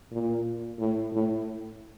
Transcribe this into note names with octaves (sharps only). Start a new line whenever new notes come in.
A#2
A2
A2